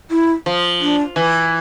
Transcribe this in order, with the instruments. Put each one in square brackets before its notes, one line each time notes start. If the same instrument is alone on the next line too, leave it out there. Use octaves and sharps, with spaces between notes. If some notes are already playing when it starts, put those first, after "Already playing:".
[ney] E4
[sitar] F3
[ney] D4
[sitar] E3